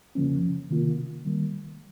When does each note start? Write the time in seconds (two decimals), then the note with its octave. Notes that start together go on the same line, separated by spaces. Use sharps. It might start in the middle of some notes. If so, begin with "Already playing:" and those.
0.15 F2 C#3 F3 A#3 C#4
0.70 C3 D#3 A#3 F4
1.25 D#3 G3 A#3